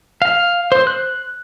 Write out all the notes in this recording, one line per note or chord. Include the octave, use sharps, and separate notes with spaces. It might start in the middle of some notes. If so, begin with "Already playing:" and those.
F5
C5
F#6